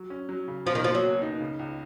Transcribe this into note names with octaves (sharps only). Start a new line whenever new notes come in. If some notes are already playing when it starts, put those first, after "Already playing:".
Already playing: F#3
C#4
F#3
C#3
B2 F3
D#3
F3 A#3
F#3
C#2
D#4
C#3
C#2